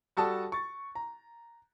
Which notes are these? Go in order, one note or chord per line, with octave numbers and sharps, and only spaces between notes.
G3 F#4 A4 D5 A5 D#6
C#6 A6
A#5